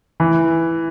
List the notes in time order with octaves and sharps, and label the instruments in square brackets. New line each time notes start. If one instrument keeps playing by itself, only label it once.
[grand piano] E3